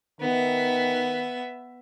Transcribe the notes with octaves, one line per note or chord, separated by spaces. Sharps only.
D#3 B3 E5